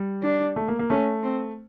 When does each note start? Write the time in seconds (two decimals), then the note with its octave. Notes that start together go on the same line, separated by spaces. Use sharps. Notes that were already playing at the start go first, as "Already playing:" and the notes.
Already playing: G3
0.23 D4
0.56 A3
0.68 A#3
0.79 A#3
0.90 A3 C#4
1.23 C4